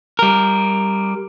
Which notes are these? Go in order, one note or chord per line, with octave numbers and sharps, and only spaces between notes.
G3 A#4